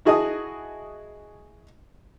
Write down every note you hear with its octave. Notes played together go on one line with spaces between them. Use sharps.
E4 F#4 G#4 D#5 A5 D#6